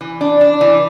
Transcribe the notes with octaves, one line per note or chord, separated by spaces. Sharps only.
E3
D4
D4
E3